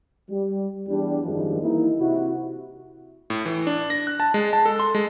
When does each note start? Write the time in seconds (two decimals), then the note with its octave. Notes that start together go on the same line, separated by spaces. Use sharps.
0.30 G3
0.88 E2 G3 D4
1.24 G#1 F#2 D#3 F3 G3 G#3
1.62 E3 A#3 D#4 E4
1.99 C3 E4 F#4
3.30 A2
3.45 E3
3.67 D4
3.90 A#6
4.07 F#6
4.20 A5
4.34 G#3
4.53 A5
4.66 A4
4.79 C6
4.95 G#3